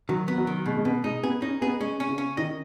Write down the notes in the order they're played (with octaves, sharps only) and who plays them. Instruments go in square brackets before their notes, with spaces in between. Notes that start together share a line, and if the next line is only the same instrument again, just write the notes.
[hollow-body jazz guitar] D#3 [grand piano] F#3
[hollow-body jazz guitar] B3
[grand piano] F#3
[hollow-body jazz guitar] D#3
[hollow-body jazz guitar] B2 [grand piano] G#3
[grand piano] G#3
[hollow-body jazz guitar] B2 [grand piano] B3
[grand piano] G#3 [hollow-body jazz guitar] D#4
[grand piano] B3 [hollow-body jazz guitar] G#4
[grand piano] C#4 [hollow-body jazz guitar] D#4
[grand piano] B3 [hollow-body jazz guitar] G#4
[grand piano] G#3 [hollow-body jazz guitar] C#4
[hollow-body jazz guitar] C#4
[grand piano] C#3
[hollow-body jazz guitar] C#4
[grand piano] D#3 [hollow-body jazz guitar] D#5